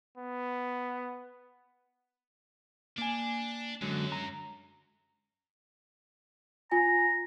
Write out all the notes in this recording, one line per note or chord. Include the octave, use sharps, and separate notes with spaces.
B3
A#3 D4 G#5
F#2 D3 F#3 G#3
A#5
F4 G#5 A#5